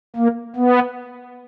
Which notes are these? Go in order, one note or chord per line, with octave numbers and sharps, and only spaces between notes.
A#3
B3